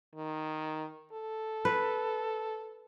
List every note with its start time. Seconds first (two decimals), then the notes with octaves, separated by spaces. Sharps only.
0.15 D#3
1.12 A4
1.65 B4